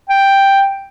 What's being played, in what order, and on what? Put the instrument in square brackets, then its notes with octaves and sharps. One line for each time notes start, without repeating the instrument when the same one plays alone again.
[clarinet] G5